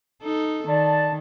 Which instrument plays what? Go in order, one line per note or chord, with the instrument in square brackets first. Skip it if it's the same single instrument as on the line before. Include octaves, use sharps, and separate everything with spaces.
[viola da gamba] D#4 A4
[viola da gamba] D#3 [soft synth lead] D5 [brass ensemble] A5